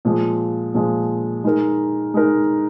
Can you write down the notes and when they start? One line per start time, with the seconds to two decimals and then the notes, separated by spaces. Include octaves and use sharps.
0.05 A#2 F3 G#3
0.74 A#2 F3 G#3
1.44 G#3 D#4 A#4
2.14 G#3 D#4 A#4